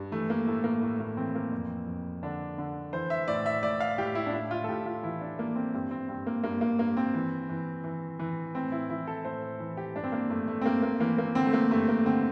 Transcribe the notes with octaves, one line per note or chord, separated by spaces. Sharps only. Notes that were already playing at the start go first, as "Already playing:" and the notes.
Already playing: G2
E3 A3
A#3
A2 A3
A#3
A2 A3
A#3
E3 C4
A#3
F2
F2
D3 D4
D3
E3 C5
E5
A2 D5
E5
A2 D5
F5
A2 G4
E4
D4
A2 E4
F4
A4
A2 G4
F4
E3 E4
D4
E3 A#3
C4
G2 C4
C4
G2 C4
A#3
G2 A#3
A#3
G2 A#3
C4
E3
E3
E3
E3
A2 C4
E4
E3 E4
A4
A2 C5
E3
G4
G2 D4
C4
A#3
G2 A3
A3
C4
G2 A#3
A#3
E3 A#3
A#3
D3 C4
A3
A#3
G2 A3
A#3
D3 C4